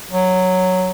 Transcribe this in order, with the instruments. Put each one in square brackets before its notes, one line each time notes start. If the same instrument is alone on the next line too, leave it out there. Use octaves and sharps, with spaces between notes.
[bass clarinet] F#3